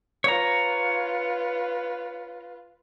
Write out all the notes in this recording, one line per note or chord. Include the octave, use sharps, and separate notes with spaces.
F4 B4 C#5 A#5